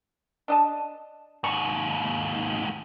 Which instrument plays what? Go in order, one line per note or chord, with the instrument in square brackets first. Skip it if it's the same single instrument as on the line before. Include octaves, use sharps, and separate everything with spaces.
[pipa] D4 D#5 A5
[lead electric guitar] D#2 G#2 [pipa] C#6